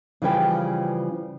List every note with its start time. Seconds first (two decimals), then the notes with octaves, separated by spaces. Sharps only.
0.22 C#3 E3 F3 G3 B4 G5